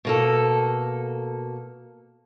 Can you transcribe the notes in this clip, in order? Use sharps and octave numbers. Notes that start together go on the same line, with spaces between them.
B2 A#3 A4